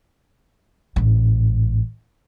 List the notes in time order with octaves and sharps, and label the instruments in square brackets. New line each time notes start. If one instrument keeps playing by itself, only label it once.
[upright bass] A1 G#2